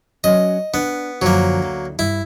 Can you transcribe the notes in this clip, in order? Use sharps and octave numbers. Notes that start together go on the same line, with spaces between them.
F#3 C#4 D#5
B3 D4
F#2 D3 F3 F#3 A#3
D2
G2 E4